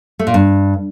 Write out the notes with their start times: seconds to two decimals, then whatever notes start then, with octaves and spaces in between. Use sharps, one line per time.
0.19 A3
0.27 A#2
0.34 G2